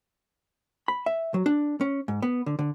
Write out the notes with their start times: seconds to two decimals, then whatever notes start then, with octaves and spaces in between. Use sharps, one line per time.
0.88 B5
1.06 E5
1.34 F#3
1.46 D4
1.81 C#4
2.08 G#2
2.22 B3
2.46 D3
2.59 D3